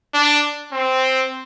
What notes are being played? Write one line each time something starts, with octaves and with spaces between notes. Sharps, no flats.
D4
C4